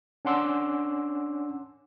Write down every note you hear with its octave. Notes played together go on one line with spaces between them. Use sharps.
C#4 D4 F#5 C6 D6 E6